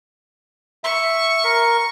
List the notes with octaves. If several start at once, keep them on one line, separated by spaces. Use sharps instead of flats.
E5 C#6
A#4